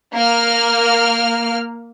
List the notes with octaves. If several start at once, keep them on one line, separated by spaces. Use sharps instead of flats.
A#3 F6